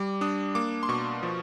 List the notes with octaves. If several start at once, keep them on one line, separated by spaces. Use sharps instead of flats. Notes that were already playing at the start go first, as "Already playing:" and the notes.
Already playing: G3 D6
D4 D#6
A#3 D6
C6
B2 C#6
F3